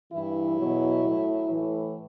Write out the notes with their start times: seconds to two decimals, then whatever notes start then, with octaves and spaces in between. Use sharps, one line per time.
0.10 G2 E3 E4
0.57 E2 B2 F#3
1.04 A2 F#3
1.50 A2 E3